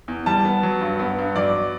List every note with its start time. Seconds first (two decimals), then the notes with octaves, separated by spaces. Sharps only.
0.08 E2
0.26 G3 A5
0.45 B3
0.63 F#3
0.81 G2
0.99 B3
1.18 G2
1.36 F#3 D5